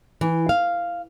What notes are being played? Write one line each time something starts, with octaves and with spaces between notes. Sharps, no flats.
E3
F5